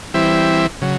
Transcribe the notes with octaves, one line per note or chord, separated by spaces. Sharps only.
E3 G3 C4 E4
C#3 F#3